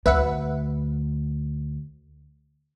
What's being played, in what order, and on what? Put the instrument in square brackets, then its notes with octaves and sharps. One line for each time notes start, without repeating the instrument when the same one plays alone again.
[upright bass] D2 [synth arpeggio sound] B4 E5 F#5